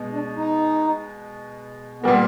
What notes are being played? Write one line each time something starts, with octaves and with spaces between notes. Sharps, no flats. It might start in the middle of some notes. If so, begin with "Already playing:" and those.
Already playing: B2 G#3 B3
D4
D#4
A#2 G3 A#3 B3